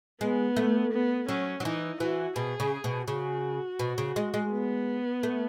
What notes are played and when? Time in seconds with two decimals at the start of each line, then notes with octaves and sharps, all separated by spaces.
0.21 G#3 B3
0.56 A3
0.92 B3
1.28 F#3 C#4
1.60 F#3
1.64 E3 D#4
2.00 E3 F#4
2.36 B2 G#4
2.60 C#3
2.84 B2
3.08 C#3 F#4
3.79 B2
3.98 C#3
4.16 G#3
4.34 G#3
4.52 B3
5.23 A3